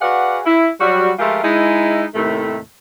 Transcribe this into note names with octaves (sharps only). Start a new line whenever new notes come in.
F#4 G#4 B4 D5 F5 F#5
E4
F#3 G3 F#4
F3 G#3 A3 F4 G4 A#4
G#3 D#4 E4
D#2 A2 C3 D#3 A3